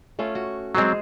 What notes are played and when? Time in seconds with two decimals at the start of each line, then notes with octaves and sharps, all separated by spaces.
0.19 A3 C#4 F4
0.35 F#4
0.75 F#3 G#3 C4 G#4 C5